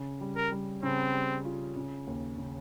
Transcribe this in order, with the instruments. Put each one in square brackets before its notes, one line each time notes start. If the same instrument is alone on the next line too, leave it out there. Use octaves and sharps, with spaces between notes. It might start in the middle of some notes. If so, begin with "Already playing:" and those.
Already playing: [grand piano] C#3
G3
[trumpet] A#4
[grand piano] G3
[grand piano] C#3 [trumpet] C4
[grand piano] G3
F4
C#3
D#2
C#3